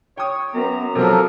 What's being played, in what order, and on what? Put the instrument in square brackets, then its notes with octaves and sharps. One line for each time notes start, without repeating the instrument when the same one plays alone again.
[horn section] C#5 [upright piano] G5 D#6
[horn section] F#2 A#5 [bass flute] B3
[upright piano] C3 C4 [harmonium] F3 A4 A#4 [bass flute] F#3